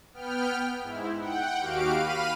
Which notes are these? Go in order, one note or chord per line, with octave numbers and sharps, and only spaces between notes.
B3 G5 F6
G#2 E4
F#5 G5
D#2 F#4 G4 F5 D7
F5 B5 F6 D#7